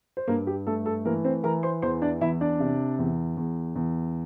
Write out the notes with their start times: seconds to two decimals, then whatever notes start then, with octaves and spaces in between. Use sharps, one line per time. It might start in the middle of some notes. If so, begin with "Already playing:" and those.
0.17 C5
0.27 G2 A#3 A#4
0.47 G4
0.67 A3 A4
0.86 A4
1.05 E3 A#3 A#4
1.24 C4 C5
1.43 E3 A#4 A#5
1.63 C5 C6
1.82 E2 C5 C6
2.02 D4 D5
2.21 E2 E4 E5
2.41 D4 D5
2.60 C3
2.99 E2
3.37 E2
3.76 E2